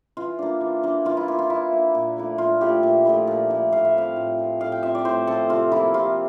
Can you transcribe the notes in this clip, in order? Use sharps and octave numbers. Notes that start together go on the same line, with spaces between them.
E3 F4
A#3 D4
E3
A#3 D4
E3 F4
E4
A#3 D4 F4
F4
E3 E4
A#3 D4
A#2
F3 A3 E4
A#2 F4
F3 A3 E4 G4
A#2
F3 A3 E4
A#2
F3 A3 E4
A2 F5
E5
F3 C4 F5
A2
F3 C4
A2 F5
G5
F3 C4 E5
D5
A2 C5
F3 C4 A4
C3 F4
F3 A#3 E4
C3 F4